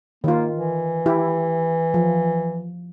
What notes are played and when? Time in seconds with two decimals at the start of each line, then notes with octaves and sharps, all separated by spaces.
0.24 D#3 A#3 F4
0.53 E3
1.06 E4 G4
1.94 F3